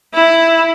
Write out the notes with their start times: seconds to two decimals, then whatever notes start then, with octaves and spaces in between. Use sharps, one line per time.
0.14 E4